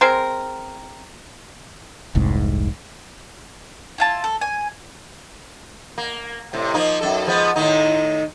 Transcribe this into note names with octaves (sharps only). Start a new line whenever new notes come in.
G#3 C4 A#4
F1 C2 G#2
E4 F4 A5
A4
G#5
A#3
A2 C3
F3 A#3 D#4
F#2 A4
F3 G#3 B3
A2 D#3 D#4